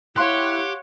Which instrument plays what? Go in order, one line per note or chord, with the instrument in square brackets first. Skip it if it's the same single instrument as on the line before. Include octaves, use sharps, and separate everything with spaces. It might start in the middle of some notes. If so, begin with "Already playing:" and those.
[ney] E4 [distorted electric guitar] G4 [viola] C#5 F#5 [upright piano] F5 C6 F#6